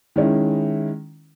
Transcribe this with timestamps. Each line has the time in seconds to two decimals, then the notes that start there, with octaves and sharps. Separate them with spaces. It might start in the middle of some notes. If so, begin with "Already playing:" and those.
0.16 D#3 G#3 C#4 E4